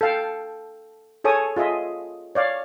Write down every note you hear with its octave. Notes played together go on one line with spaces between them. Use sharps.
A4 F5 G5
G#4 A4 C#5 G#5 D#6
F4 G#4 D#5 E5
C#5 D5 F5